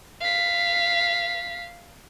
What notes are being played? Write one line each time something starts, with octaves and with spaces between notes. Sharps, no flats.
F5 B6